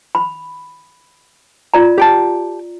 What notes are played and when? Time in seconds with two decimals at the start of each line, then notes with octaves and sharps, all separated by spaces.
0.15 B5
1.74 F4 D5 A#5
1.98 G4 G5 A5